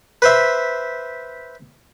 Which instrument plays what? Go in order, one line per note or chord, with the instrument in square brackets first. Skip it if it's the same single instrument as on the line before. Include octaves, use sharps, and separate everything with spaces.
[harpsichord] B4 C5 E5